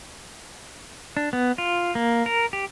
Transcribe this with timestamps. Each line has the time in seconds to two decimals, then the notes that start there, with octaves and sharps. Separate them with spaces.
1.17 D4
1.33 B3
1.58 F4
1.95 A#3
2.26 A#4
2.53 G4